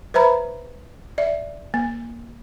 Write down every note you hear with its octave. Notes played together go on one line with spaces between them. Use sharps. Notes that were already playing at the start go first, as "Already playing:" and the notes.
B4 C5 E5 A#5 B5
D5 E5
A#3